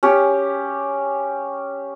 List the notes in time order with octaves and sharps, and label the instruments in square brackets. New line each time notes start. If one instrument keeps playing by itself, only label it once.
[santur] C#4 G4